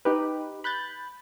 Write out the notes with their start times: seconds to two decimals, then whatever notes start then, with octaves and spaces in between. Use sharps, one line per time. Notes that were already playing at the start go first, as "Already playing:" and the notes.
0.05 D#4 G4 B4
0.64 B5 F#6 G6 A6